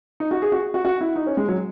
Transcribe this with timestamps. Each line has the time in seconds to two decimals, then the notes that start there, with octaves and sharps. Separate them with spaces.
0.20 D#4
0.31 F#4
0.42 G#4
0.52 F#4
0.74 F#4
0.85 F#4
1.01 E4
1.16 D#4
1.27 C#4
1.37 G#3
1.49 F#3